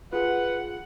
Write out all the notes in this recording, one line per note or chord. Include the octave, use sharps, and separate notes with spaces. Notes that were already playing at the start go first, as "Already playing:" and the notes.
F4 G#4 B4 F#5